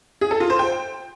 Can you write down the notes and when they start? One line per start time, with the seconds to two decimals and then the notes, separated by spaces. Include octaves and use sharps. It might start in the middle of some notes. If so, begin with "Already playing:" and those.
0.21 G#4
0.31 A4
0.40 F4
0.50 C5
0.59 G5